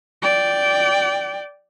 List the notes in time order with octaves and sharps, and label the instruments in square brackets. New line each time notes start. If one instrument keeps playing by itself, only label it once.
[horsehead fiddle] D5 G5